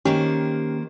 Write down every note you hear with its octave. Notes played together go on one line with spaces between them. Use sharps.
D#3 A#3 C#4 G4 C5